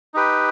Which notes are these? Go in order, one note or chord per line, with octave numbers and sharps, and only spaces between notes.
D#4 G4 B4